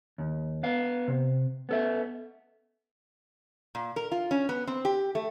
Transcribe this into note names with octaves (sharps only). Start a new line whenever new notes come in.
D#2
B3 F5
C3
B3 A4 E5
A#2
A#4
F4
C#4
B3
C4
G4
A3